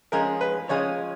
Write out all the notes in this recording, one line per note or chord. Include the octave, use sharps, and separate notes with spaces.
F3 G#3 C#4 G#4 A#4
B4
F3 G#3 C#4 G#4 C#5